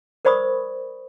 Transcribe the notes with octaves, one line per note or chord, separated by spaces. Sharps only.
A#4 C5 D5 B5 C#6 D#6